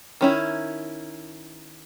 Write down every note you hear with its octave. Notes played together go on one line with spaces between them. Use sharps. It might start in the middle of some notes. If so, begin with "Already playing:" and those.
D#3 C#4 E4